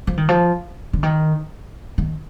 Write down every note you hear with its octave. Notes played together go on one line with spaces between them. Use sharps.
F3
D#3
F3
D3
D#3
D#3